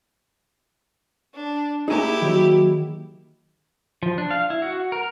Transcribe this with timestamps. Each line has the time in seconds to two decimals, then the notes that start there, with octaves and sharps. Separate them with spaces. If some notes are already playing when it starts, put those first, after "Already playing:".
1.35 D4
1.88 A#3 D#4 E4 G4 G#4 G#5 A#5
2.22 D#3 F#3
4.03 F3
4.18 D4
4.31 F5
4.50 E4
4.62 F#4
4.92 A#4